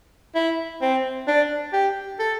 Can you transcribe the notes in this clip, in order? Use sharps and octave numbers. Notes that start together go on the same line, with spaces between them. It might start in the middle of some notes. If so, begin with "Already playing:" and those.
E4
C4
D4
G4
A4